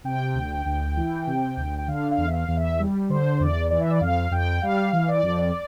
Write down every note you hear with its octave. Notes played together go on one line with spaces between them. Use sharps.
C3 G5
D2
D2
E3
C3
D2
G5
D3 F5
F5
E2
E5
F5
E2
E5
G3
D3 C5
E2 D5
E3 D5
E5
D5
F2 F5
F2 G5
G3 F5
E3
D5
F2